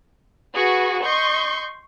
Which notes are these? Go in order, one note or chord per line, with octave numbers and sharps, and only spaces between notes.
F#4 G#4 B4 C#6
D#5 C6 C#6 G6